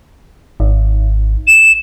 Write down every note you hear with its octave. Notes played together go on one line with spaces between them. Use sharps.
G#1
E7